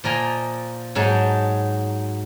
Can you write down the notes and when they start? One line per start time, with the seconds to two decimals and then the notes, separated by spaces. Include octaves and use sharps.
0.04 A#2 F3 A#4 D#5 G#5 A#5
0.95 G#2 F#3 D#4 A5